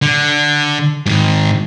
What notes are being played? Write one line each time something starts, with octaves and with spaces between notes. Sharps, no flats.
D3
G#2 D#3